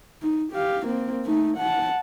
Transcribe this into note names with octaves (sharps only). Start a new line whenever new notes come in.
D#4
G4 F5
A#3 C4
A3 D#4
F#5 A5